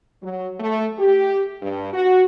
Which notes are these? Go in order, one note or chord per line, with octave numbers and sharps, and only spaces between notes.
F#3
A3
G4
G2
F#4